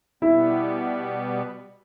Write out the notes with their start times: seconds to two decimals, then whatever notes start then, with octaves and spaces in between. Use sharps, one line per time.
0.22 B2 G3 B3 E4